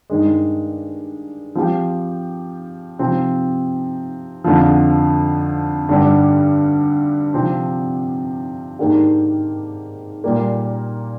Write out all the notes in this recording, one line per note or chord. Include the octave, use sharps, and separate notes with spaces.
G2 D#3 G#3
F3 C4 G4
C3 F3 C4
F2 D3 F3
G2 D3 G3
C3 F3 C4
G#2 D#3 A#3 D4 G4
A#2 G3 A#3